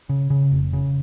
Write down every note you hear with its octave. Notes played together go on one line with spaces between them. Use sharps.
C#3
C#3
F1
C#3